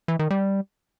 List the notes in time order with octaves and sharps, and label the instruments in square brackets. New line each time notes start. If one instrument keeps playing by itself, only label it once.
[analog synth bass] E3
D#3
G3